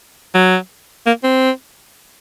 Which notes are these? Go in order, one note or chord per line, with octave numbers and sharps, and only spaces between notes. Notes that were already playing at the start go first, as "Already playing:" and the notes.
F#3
A#3
C4